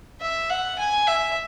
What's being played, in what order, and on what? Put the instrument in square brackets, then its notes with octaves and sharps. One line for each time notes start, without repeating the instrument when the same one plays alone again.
[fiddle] E5
F#5
G#5
E5